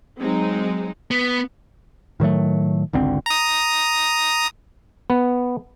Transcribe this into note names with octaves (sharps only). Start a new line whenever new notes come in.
F#3 G#3 C4 D#4
B3
A2 D#3 F#3 A3
G#1 C#2 D3 C4
A#5 D#6
B3